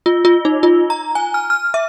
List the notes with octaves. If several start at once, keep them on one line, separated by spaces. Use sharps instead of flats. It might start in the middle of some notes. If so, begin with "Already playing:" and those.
F4
F4
D#4
F4
A#5
G#5
F6
F6
E5